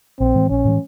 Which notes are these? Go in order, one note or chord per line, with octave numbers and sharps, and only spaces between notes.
A#1 C4
A2 E3 G#3
A#1 C#4
A2 E3 G#3